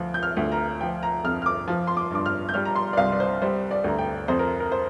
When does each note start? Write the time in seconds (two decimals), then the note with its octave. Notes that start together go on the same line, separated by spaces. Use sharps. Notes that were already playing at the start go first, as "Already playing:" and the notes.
Already playing: D2 F3
0.14 G6
0.23 F6
0.37 D2
0.52 A#5
0.81 F3 G5
1.03 A#5
1.24 F2 F6
1.42 F6
1.46 D6
1.68 F3
1.87 C6
1.97 D6
2.11 G2 D6
2.26 F6
2.49 G6
2.54 G3 F6
2.65 A#5
2.76 C6
2.93 D5
2.97 C2 F5
3.12 D5
3.20 C5
3.42 G3 C5
3.71 D5
3.84 D2 A#5
3.98 G5
4.28 F2 C5
4.39 A#4
4.60 A#4
4.72 C5